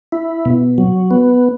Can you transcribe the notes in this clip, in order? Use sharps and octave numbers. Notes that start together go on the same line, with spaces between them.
E4
B2
F#3
B3